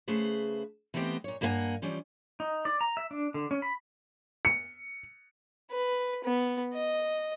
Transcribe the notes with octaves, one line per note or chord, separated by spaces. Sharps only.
C#3 A3 G#4 B4 C5
E3 A3 B3 C4 G4 D#5
A#2 C#5
G2 A#3 F#4 B4 F#5 G#5
E3 F3 G3 C#4
D#4
D5
A#5
E5
D4
D3
C#4
B5
C#7
B4
B3
D#5